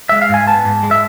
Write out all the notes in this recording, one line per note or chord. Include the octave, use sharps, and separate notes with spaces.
G#3 E5
F5
G#2 G#5
B3 A5
G#2
G#3
E5